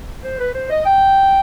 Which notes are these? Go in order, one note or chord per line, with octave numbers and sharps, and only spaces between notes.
C5
B4
C5
D#5
G5